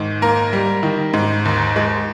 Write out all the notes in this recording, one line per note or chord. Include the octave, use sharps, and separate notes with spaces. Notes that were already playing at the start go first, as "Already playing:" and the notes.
Already playing: G#2 D#3
A#3 A#4
G3
D#3
G#2
D#2
G#3